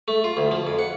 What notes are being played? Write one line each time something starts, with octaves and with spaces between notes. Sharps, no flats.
A3
F4
D2
F3
F2
F#5